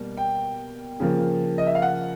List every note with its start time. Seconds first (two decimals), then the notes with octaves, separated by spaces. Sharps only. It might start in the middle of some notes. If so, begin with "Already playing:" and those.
Already playing: B2 G3 A#3
0.17 G5
1.00 C#3 F3 A#3
1.58 D#5
1.67 E5
1.75 F5
1.82 F#5